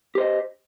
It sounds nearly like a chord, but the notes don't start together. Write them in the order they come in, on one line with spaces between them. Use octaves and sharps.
G4 C5 D#5